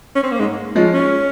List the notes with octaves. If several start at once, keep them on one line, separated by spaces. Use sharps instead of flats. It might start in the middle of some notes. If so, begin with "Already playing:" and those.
C#4
C4
A#3
G#2 G#3
F3 G#3 C#4 F4
C#4